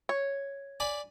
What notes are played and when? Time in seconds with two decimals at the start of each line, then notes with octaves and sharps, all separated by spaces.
0.09 C#5
0.80 D5 G#5 B5